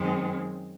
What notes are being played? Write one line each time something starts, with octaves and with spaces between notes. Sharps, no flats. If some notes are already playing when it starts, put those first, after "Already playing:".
Already playing: F#2 D#3 G#3 C4